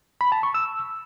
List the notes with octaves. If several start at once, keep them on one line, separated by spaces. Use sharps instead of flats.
B5
A5
C#6
E6